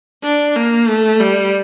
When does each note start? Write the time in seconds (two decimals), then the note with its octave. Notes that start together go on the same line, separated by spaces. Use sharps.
0.23 D4
0.56 A#3
0.88 A3
1.20 G3